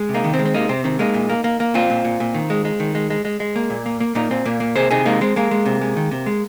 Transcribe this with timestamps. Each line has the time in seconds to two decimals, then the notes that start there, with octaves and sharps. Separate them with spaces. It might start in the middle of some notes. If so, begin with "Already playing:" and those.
Already playing: G#3
0.09 C3
0.14 A#3 D#4
0.24 D#3
0.34 C4
0.39 G#3
0.45 C4
0.54 C3 A#3 D#4
0.69 C3 C4
0.84 D#3 C4
0.99 G#3 A#3 D#4
1.14 A#2
1.30 A#3
1.44 A#3
1.60 A#3
1.74 A#2 C4 F4
1.90 A#2
2.05 A#2
2.20 A#2
2.34 D#3
2.50 G#3
2.65 G#3
2.80 D#3
2.95 G#3
3.10 G#3
3.25 G#3
3.40 G#3
3.56 A#3
3.70 A#2
3.86 A#3
4.00 A#3
4.15 A#2 A#3 D#4
4.31 A#2 C4
4.45 A#2 A#3
4.60 A#3
4.76 C3 G#4 C5
4.91 C3 D#4 G#4
5.05 G#3 A#3 D#4
5.21 G#3 C4
5.36 G#3 A#3
5.51 G#3
5.66 C3
5.81 G#3
5.97 D#3
6.11 C3
6.26 G#3